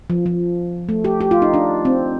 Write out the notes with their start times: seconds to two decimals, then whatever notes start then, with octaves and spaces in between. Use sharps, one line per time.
0.10 F3
0.26 F3
0.89 A3
1.04 G4
1.21 G4
1.31 F4
1.42 D#4
1.54 D4
1.85 C4